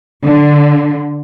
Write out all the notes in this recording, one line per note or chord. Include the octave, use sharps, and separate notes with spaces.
D3